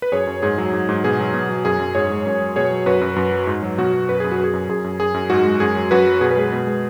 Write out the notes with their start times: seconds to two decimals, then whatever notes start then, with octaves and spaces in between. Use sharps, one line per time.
0.02 B4
0.12 F#2 G#4 C#5
0.27 F#2
0.42 G#2 G#4
0.58 F#3
0.73 G#2
0.89 G#2
1.04 B2 G#4
1.20 F#3
1.34 B2
1.49 F#3
1.65 F#2 G#4
1.80 F#2
1.95 G#2 G#4 C#5
2.10 G#3
2.26 F#2
2.41 F#3
2.56 B2 G#4 C#5
2.71 F#3
2.86 F#2 F#4 B4
3.01 F#2
3.16 F#2
3.32 F#3
3.47 G#2
3.63 F#3
3.78 B2 F#4
3.93 F#3
4.09 F#2 B4
4.20 F#2 G#4
4.32 F#4
4.39 F#2 G#4
4.53 F#2
4.69 F#2 G#4
4.84 F#2
5.00 F#2 G#4
5.14 F#2
5.30 G#2 F#4
5.45 G#3
5.60 F#2 G#4
5.76 F#3
5.91 F#2 F#4 B4
6.06 F#3
6.21 B2 G#4
6.31 B4
6.37 G#3 G#4
6.52 B2
6.67 G#3